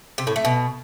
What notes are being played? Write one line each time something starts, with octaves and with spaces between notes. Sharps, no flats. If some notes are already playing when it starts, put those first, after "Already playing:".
C3
A2
A3
B2